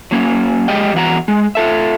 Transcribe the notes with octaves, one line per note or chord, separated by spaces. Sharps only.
F#3 A#3 C#4
G#3 G4 D#5 G5
E2 F#4 A#5
G#3
F4 A4 E5